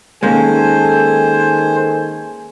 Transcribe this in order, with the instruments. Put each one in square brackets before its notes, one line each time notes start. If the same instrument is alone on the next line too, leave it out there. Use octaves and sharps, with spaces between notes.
[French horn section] D#3 A4 [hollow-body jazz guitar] G#3 A#3 C#4 [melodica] C5 [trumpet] G#5